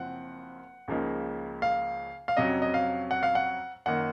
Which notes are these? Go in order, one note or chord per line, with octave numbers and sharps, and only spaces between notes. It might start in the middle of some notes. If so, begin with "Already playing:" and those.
Already playing: F#1 F#2 F3 C4 F#5
C#2 C#3 F3 A#3 D#4
F5
F5
F2 C3 F#3 C#4 D#5
D#5
F5
F#5
F5
F#5
F#2 D#3 A#3 D#4 F#5